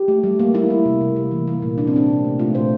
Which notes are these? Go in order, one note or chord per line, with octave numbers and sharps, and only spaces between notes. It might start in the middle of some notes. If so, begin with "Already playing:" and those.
Already playing: G4
A3
G3
A#3
G3 E4
A#3
C3
C3
A#3
E3
A#3
A#2
C3 D4
C4
C3 D4
C3
A3
A3 F4
A#2 C5